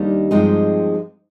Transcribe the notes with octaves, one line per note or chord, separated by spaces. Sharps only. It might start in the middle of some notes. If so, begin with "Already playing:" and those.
Already playing: D#2 D#3 G3 D4
G2 F3 G#3 C4 D#4